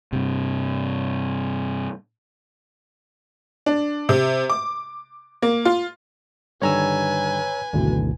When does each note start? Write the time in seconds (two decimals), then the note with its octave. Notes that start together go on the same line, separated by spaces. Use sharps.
0.13 G2 C3
3.66 D4
4.09 C3
4.50 D6
5.42 A#3
5.65 F4
6.62 G2 D3 D#3 B4 C#5 G#5 A#5 E6
7.73 G#1 D2 B2 D3 E3 F#3